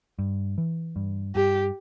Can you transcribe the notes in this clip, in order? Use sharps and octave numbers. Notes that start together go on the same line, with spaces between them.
G2
E3
G2
G2 G4